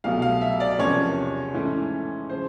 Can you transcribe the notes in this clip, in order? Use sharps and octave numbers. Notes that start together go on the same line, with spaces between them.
C2 B2 F#3 A3 F5
F5
E5
D5
E2 C3 F3 A#3 C#4 C#5
G#2 E3 A3 C#4
C#3 F3 C5